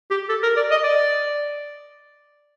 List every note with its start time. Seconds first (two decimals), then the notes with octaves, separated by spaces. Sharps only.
0.11 G4
0.29 A4
0.43 A#4
0.57 D5
0.71 D#5
0.83 D5